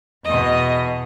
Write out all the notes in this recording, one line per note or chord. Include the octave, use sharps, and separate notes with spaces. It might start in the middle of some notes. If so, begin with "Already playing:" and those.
E2 B2 D#5